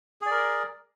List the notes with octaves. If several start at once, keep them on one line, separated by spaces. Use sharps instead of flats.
G#4 A#4 D5